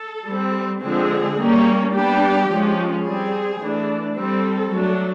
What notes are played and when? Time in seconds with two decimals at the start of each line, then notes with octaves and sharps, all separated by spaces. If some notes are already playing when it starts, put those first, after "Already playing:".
Already playing: A4
0.27 G3 C4
0.82 D3 F3 G#3 C4 G#4
1.38 G3 A#3 C#4
1.93 G3 B3 D4 G4
2.50 F3 G#3 C#4
3.04 G3 C4 G#4
3.60 E3 A3 D4
4.16 G3 C4 A4
4.71 F#3 A3 D4